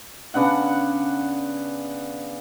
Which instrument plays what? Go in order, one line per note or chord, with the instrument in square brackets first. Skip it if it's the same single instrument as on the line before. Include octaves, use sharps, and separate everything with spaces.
[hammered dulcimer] C#3 B3 D4 F#5